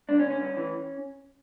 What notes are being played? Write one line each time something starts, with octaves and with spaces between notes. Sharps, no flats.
G2 D4
C#4
D3
C#4
G2
E3